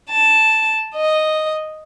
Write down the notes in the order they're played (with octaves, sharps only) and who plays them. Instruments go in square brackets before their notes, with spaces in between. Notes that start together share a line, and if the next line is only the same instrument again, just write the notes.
[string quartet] A5
D#5